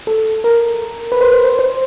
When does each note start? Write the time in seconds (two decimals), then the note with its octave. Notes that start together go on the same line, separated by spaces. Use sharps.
0.07 A4
0.44 A#4
1.12 B4
1.21 C5
1.33 C5
1.45 C5
1.59 C5